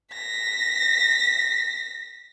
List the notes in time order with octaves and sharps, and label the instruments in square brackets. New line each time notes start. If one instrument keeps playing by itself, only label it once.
[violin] A#6 B6